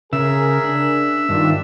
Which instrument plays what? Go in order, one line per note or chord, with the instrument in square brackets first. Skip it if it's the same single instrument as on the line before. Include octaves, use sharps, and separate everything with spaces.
[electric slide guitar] C#3 [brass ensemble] G#4 A#4 [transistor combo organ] E5
[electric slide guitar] D4
[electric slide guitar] G2 [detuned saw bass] D#3 [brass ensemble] C4 D4 F4